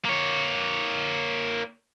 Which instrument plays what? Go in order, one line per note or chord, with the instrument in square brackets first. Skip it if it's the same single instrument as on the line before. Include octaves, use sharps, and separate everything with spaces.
[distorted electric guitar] A#3 C#5